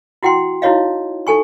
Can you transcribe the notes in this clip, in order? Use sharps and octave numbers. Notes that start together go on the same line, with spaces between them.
E4 F#4 F#5 G5 C6
D#4 E4 F#4 C#5 D#5 F5
D#4 A4 G#5 C#6